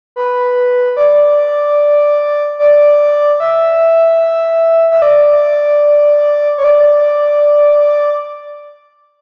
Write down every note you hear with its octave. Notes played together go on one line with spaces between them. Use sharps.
B4
D5
D5
E5
E5
D5
C#5
D5